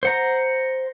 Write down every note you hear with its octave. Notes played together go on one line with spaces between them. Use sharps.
C5 F#5 A#5